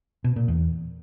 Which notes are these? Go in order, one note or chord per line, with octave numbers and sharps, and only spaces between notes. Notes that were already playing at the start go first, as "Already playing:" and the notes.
B2
A#2
E2